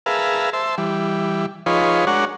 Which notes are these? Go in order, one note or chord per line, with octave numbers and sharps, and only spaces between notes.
G#4 A#4 B4 E5 F5 A5
C5 E5 A5
E3 G3
F3 D#4 F4 G#4 B4 C#5
G#3 D4 F#4 A#4 C#5 F#5